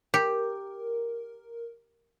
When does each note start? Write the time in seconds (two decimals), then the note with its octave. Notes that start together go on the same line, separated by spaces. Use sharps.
0.14 G4 A#4